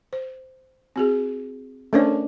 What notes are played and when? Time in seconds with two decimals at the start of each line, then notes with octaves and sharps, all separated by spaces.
0.13 C5
0.96 C4 F#4 G#4
1.93 A3 C#4 D4 A4 A#4 C5